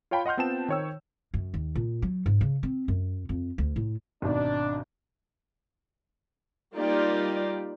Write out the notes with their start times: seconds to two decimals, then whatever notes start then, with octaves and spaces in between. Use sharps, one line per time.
0.11 F4 C#5 F5 G5 A5 B5
0.26 D#5 F#5 C6 F6 G6
0.37 B3 C4 F4 G5 A5 E7
0.68 D#3 C5 C#5 G5 E6
1.34 F#2
1.54 D#2
1.76 A#2
2.02 F#3
2.26 G#2
2.41 C#3
2.63 C4
2.88 F#2
3.29 F2
3.58 D2
3.76 A2
4.22 G#1 B2 D4 D#4
6.75 G3 A#3 D#4 F4 G4 D5